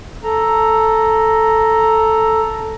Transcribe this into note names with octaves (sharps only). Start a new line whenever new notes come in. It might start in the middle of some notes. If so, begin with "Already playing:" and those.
A4 A#5